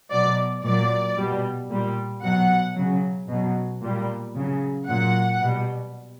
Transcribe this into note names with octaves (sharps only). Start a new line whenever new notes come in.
B2 F#3 D5
A#2 F#3 D5
B2 G3
A#2 G3
B2 F#3 F#5
C#3 F#3
B2 F#3
A#2 G3
C#3 F#3
A#2 F#3 F#5
B2 G3